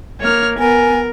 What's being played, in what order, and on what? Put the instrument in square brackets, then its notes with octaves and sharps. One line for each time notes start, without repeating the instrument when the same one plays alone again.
[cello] A#3 [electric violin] C#5 F6
[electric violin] B3 [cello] A#4 [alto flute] G#5